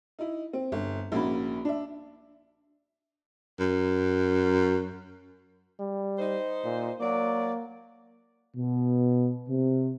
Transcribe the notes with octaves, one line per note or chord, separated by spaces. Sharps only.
D#4 E4
C4
G1
A#1 G#2 A#3 C#4 F#4 B5
D4 E5
F#2
G3
D#4 C5
A#2
F#3 A#3 D5
B2
C3